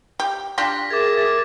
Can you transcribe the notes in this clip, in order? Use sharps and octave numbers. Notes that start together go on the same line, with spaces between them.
G4
D4 F4 G4 A#6 B6
G#4 A#4 E5 D6 G#6 A6